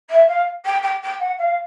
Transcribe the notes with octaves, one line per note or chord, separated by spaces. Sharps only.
E5
F5
G5
G5
G5
F#5
F5